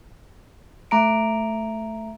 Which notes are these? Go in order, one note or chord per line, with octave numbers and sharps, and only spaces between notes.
A3 A#5 D7